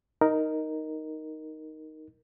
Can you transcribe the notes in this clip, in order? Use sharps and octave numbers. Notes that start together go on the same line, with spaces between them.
D#4 A#4